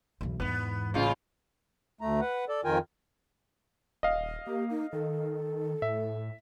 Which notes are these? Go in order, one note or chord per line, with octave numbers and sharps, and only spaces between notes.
B1 E2
E2 G#2 B3
A1 A#2 C#3 F4
D2 A3 A#5
B4 F#5
A4 D5
F2 D#3 F4 A#4 G5 G#5
D#1 D#5 F5
A#3 G4
D#4
D#3 A4
A2 E5